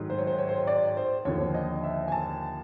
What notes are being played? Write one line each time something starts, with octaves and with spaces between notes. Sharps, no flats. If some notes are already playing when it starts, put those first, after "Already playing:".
Already playing: G#2 D#3 F#3 A3
C5
C#5
C5
C#5
C5
C#5
D5
C5
D#2 D3 F3 C#5
D#5
E5
G#5
A5